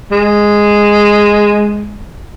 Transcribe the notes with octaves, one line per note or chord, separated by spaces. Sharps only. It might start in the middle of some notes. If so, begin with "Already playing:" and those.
G#3